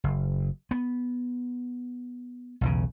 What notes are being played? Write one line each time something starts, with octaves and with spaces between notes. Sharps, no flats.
F#1
B3
B1 E2 C#3